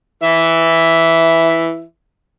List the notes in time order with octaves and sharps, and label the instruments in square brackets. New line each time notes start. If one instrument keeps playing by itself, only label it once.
[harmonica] E3 E5